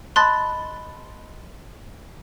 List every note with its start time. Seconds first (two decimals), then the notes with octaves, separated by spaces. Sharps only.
0.16 D#5 A5 B5 C6 F#6 A6